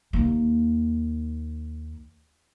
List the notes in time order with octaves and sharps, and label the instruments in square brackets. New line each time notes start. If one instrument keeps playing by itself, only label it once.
[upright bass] D#2 A#3